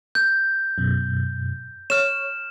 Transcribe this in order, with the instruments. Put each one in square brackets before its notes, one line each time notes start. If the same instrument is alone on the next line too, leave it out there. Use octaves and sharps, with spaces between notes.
[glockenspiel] G6
[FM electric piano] F#2 B2
[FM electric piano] C#5 [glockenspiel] F6 E7